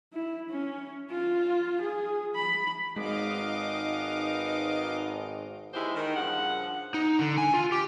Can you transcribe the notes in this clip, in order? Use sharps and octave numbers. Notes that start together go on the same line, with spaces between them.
E4
C#4
F4
G#4
B5
G#1 G#3 B3 D#4 D#5 F5 D6
D#2 E3 G#3 E4 G4 C5
D#3
G2 C#3 F3 F#5
D#4
D3
G#5
F4
G4